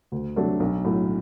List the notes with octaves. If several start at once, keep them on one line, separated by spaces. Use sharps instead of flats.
D2
C3 F#3 A3 D4
B1
A2 F#3